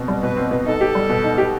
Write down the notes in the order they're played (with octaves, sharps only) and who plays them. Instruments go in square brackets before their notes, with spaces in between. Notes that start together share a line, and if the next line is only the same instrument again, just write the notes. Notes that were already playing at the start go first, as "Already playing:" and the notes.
Already playing: [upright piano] B2 C4
G3
[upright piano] B2 [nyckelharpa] B4
[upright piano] C4
B2
[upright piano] D#4 [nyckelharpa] A4
[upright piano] G4
G3
B2
D#4
G4